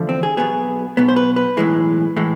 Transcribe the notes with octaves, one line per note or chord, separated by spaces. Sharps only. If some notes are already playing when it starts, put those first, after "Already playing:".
Already playing: E2 D3 F3 A3
C4
G#4
B1 B2 B3 G#4
B1 B2 B3
C5
B4
B4
B1 A2 E3 G#3
A2 E3 G#3